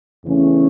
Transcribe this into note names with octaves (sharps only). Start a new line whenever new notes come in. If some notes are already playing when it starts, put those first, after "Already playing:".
E2 C#3 E3 A3 C#4